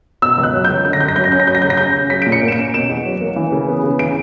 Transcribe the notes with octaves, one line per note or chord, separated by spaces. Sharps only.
B2 E6
C#2
F#6
F#3
C#2 G6
D3 G6
A#6
F#2 G6
A#6
F#3 G6
A#6
C#4 G6
A#6
F#3 G6
A#6
C#3 G6
A#6
C#4 G6
C#3
F#3 B6
A#2 D7
C#7
A#3
E7
D7
C#4
B2 E7
E2
F#3
A#3
E3
C#3
B3
C#3
E3 D7